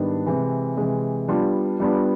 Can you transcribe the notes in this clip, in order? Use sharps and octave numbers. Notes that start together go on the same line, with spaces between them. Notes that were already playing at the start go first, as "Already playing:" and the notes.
Already playing: G#2 D#3 G3 B3 D4
C3 E3 G#3
C3 E3 G#3
G3 B3 D4 F4
G3 B3 D4 F4